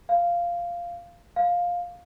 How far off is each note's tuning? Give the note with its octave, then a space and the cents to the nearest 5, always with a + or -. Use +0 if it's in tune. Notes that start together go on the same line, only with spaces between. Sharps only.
F5 -10
F5 +10